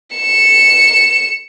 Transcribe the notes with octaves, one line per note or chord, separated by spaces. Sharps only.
C#7 E7